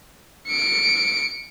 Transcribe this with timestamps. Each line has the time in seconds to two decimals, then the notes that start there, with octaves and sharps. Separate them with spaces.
0.49 C#7 D7